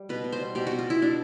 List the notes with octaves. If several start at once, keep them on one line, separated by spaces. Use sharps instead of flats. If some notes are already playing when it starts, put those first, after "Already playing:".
Already playing: G3
B2 B4
B2
C5
G3
B2 G4
B2 F#4
F4
B2 E4
B2 D4